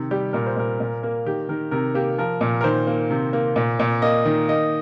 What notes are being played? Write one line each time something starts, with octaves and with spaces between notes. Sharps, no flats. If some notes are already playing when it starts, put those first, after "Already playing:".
Already playing: C3 D#3
G3 G4
A#2 A#4
C5
A#2 A#4
A#2
A#3
D#3 G4
D#3 A#4
C3 A#4
A#3 G4
F3 A#4
A#2
A#4
D#3 C5
A#3
C3
A#3
A#2
A#2
A#3 D#5
D#3
A#3 D#5